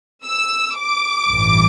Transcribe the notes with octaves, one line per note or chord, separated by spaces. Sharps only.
E6
D6
A1 G2 E3